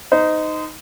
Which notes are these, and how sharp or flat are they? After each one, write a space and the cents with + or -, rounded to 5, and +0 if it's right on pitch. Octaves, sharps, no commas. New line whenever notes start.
D#4 +0 C5 -30